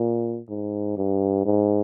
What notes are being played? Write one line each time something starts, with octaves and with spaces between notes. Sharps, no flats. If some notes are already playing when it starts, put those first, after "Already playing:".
Already playing: A#2
G#2
G2
G#2